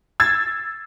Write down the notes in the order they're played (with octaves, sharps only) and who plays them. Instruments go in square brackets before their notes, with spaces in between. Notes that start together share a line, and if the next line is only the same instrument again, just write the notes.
[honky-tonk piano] E6 G#6 A6